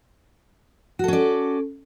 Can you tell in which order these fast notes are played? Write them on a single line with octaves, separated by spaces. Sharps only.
F#4 A4 C#4 D5